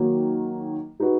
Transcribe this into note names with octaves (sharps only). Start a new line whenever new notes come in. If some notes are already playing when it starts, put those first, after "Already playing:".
Already playing: D#3 F#3 A#3
G#3 D#4 F#4 B4